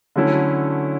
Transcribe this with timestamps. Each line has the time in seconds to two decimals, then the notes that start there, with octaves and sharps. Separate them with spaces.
0.16 D3 F#3 A3 C#4 E4